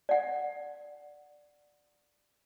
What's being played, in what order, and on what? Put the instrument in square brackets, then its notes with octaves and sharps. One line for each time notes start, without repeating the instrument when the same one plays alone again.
[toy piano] D5 F#5